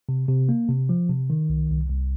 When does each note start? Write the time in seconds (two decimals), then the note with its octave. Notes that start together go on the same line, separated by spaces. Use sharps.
0.09 C3
0.29 C3
0.49 A#3
0.69 C3
0.89 F3
1.09 C3
1.30 D#3
1.49 C2
1.70 C2
1.90 C2